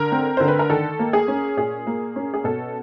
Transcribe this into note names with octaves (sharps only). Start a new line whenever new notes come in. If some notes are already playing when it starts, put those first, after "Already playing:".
Already playing: D3 A#4
C4
D3 C5
B4
A#4
D#3 A4
A#3
G#4
C#4
A#2 G#4
A#3
C#4
G#4
B2 A4